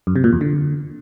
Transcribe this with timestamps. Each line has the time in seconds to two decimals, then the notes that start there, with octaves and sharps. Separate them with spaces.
0.07 F#2
0.16 C3
0.24 A#2
0.33 E2
0.41 D3